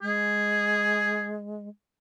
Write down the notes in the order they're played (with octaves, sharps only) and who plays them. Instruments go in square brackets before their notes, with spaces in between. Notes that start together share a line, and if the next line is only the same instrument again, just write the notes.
[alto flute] G#3 [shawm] G#4